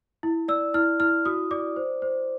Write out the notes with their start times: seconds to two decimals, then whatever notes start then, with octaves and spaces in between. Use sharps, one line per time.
0.23 E4
0.48 D5 E6
0.74 E4 F6
1.00 E4 F6
1.25 F#4 D#6
1.51 D5 D6
1.76 C5
2.02 C5